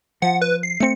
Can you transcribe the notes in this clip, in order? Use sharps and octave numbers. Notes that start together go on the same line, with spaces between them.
F3 F#5
B4
C7
A3 C4 C#7